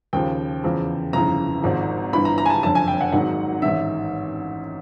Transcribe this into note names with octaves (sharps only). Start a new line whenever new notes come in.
D#2 C#3 F3 G5
E2 C#3 F3
G1 F2 C#3 E3 A#5
G#1 G#2 F3
G1 G2 E3 B5
A#5
A#5
G#5
A5
F#1 F2 D3 A5
G#5
G5
F#5
G#1 G#2 D#3 F#3 F#5
A1 G#2 D#3 E5